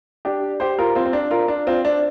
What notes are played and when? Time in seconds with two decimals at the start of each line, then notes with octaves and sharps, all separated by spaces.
0.25 D4 G4
0.60 G4 C5
0.79 F4 A#4
0.95 C4 F4
1.06 C4
1.13 D4
1.31 F4 A#4
1.48 D4
1.67 C4 F4
1.85 D4